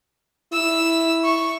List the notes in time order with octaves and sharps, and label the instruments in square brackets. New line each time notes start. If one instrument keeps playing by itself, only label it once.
[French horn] E4 [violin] E6
[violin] C#6